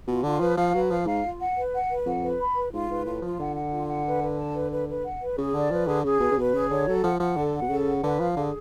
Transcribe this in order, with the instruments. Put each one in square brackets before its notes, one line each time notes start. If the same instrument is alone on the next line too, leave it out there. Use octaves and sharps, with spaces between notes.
[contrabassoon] B2 [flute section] F4
[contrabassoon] D3 [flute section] F4
[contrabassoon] F3 [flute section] B4
[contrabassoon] F3 [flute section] F5
[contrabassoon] F#3 [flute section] B4
[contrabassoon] F3 [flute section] F5
[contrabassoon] G#2 [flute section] F5
[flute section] F4
F#5
B4
F#5
B4
[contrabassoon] F2 [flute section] F#5
[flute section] B4
B5
B4
[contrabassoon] G#2 [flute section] F4
[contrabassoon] G#2 [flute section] B4
[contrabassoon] A2 [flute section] F4
[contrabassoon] F3 [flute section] F4
[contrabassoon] D3 [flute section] F#5
[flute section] F#5
F4
F#5
B4
B4
A5
B4
B4
B4
F#5
B4
[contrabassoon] C#3 [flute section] G#4
[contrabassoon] D3 [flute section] D5
[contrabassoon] F3 [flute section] B4
[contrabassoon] D3 [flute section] G#4
[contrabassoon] C#3 [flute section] G#4
[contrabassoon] B2 [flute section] B4
[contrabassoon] C#3
[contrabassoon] B2 [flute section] B4
[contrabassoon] C#3 [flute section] G#4
[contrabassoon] D3 [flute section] C#5
[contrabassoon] F#3 [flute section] A4
[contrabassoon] F3 [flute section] F#5
[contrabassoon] F3 [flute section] F#5
[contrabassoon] D3 [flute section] A4
[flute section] F#5
[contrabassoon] B2
[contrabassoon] C#3 [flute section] A4
[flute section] F#5
[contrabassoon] D3 [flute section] B4
[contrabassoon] F3 [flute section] F5
[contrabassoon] D3 [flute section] G#4